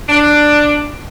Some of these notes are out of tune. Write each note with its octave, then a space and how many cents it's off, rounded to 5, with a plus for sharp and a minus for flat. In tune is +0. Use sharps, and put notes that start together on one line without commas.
D4 +10